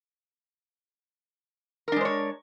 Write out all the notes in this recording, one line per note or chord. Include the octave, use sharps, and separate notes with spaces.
G#3 D4 A#4 C5 C#5